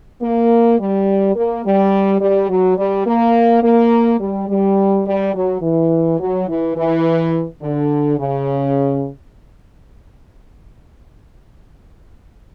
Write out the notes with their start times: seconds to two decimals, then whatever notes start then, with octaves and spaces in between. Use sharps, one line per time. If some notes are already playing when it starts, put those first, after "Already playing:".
0.22 A#3
0.79 G3
1.35 A#3
1.65 G3
2.21 G3
2.49 F#3
2.77 G3
3.06 A#3
3.63 A#3
4.20 G3
4.49 G3
5.06 G3
5.34 F#3
5.62 E3
6.20 F#3
6.48 E3
6.76 E3
7.62 D3
8.19 C#3